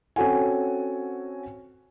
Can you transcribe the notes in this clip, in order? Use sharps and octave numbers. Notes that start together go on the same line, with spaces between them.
C4 C#4 F#4 A4 F#5 G#5